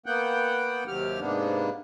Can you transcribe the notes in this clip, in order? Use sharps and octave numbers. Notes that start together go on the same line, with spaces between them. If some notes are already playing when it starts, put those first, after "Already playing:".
A#3 B3 F#5 G5
D#2 C3 F#3 G4 F6
G#2 C3 A#3 B3 D4